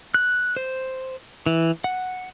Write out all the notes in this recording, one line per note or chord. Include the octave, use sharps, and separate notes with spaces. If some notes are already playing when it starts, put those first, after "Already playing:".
F#6
C5
E3
F#5